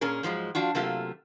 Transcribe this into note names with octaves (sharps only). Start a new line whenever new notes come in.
A#2 C#4 G#4 A#4
G#2 F3 F#3 G#3
F3 D4 F4 F#4
C3 F#3 A3 A#3 F4 G4